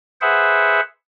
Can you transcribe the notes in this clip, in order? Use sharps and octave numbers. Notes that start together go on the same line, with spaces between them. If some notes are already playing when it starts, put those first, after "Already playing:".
G#4 B4 C5 E5 F#5